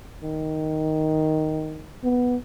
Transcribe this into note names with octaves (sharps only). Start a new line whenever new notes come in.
D#3
B3